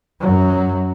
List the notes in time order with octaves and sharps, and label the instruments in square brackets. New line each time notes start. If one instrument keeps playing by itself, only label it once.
[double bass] F#2 F#3